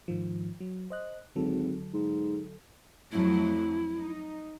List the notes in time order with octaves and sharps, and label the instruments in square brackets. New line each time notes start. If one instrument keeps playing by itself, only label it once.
[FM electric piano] G#2 D#3 F3
F#3
C5 D#5 F#6
[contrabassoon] G#1 [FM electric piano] D3 F#3 A4
[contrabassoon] G#2
[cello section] F2 F#3 A3 [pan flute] E4
[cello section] D#4